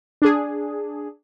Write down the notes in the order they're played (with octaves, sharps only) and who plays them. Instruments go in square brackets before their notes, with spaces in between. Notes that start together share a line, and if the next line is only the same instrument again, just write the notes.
[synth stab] D4 G#4